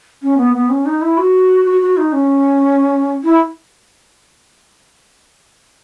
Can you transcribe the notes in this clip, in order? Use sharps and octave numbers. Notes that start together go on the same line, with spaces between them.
C#4
B3
B3
C#4
D#4
E4
F#4
F#4
F#4
D#4
C#4
E4